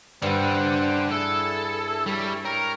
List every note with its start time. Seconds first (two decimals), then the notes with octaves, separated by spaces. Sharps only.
0.22 G2 G3 D4 C5 F#5 G5
1.11 E4 G#4 A4
2.06 G3 E4 C#5 C#6
2.45 A#4 C#5 G5 C#6